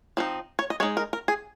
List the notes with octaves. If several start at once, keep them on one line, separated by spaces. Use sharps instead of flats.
F3 C4 D#4
C#5
D#5
G#3 D#4 C#5
A#4
A#4
G#4